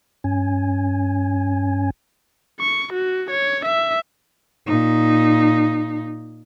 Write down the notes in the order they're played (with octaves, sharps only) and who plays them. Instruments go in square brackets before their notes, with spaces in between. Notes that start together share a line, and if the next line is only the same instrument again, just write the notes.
[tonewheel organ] G2 C#4 G#5
[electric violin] C#6
F#4
C#5
E5
[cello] A#2 D#4